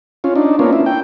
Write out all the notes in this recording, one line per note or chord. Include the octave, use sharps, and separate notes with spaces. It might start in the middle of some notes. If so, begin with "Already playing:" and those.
C#4 F4
D4 D#4
A#3 B3 C#4 D4 F4
E4
G5